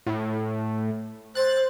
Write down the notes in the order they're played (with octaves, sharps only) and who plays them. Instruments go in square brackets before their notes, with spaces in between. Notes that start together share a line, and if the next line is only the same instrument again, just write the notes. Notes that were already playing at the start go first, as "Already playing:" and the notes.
[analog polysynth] A2
[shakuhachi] C5 [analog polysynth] F#6 A6